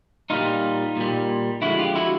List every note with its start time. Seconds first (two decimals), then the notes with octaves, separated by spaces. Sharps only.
0.30 A#2 G3 D#4 F4
0.97 A#2 G3
1.62 D3 F3 G#3 E4 F#4
1.79 F4 G4
1.95 E4 F#4